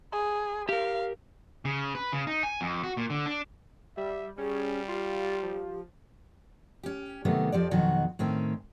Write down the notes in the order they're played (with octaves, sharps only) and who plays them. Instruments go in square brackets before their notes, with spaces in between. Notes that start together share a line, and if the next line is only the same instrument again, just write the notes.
[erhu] G#4
[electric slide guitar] G4 A#4 [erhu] F5
[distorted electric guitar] C#3
B4
C#3
D#4
G#5
F2
F#4
A#2
D3
D4
[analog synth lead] G3 [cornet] E5
[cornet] G3 [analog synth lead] C#4 [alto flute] G#4
[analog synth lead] F4 [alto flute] G4
[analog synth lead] F3
[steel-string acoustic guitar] C#4 G4
C3 D#3 F#3 A3 B3
F2 F3 G4 D5
F2 B2 D#3 F#3 F#4
A2 D#3 C4 C#4